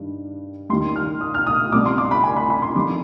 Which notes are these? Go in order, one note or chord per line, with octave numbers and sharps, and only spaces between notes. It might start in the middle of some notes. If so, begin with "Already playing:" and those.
Already playing: G2 D#3 G3
D#2 D#3 G3 C6
F6
D#6
F6
D#6
C2 B2 G3 D6
C6
D6
B5
G#5
B5
B5
C6
F2 D#3 G3 D6